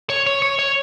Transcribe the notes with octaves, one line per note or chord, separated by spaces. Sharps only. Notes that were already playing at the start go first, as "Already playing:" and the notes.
C#5
C#5
C#5
C#5